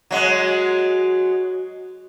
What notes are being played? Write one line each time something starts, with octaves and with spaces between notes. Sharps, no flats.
F#3 G#3